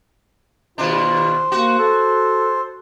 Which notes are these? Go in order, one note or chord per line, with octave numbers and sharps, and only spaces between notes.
D#2 B2 D4 F4 C5
A#3 F#4
A4